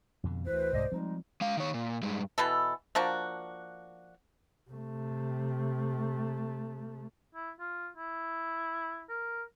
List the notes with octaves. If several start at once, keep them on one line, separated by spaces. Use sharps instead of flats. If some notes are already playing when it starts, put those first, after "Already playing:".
F2 B2 D3
D2 E3 B4 C5
C2 G#2 D5 D#5
F3 G3 G#3 C4 D#4
G#3 F5
D#3 C#5
A#2
G2 G#3
B2 E3 A4
F3 A#3 D4 F#4
C3 A3
E4
F4
E4
A#4